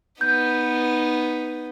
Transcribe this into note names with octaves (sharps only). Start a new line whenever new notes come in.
B3 D#4 G6